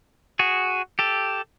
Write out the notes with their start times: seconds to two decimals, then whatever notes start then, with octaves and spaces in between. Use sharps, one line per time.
0.39 F#4 G#4
0.99 G4 A4